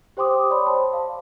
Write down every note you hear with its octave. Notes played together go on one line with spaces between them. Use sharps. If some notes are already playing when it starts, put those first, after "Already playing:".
G4 C5 G5 C6 D6 D#6
C#5 D5 B5 C6
C5 A5 C6
F5